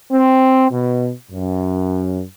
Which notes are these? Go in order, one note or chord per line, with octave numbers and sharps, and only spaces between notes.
C4
B2
F#2